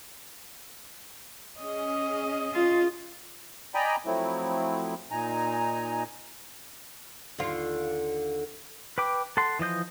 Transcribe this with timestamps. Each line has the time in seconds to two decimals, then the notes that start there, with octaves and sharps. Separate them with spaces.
1.59 C#4 G#4 D#5
2.53 F4
3.74 D5 D#5 G5 G#5 A#5 B5
4.06 F3 F#3 A3 C4 E4
5.11 A#2 D#4 G#5 A#5
7.39 D#2 D3 F4
8.98 B4 G5 D6
9.37 A4 F#5 C6
9.59 E3 F3 D#5 G6